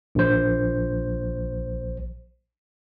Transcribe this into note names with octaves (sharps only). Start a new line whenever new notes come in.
A#1 C5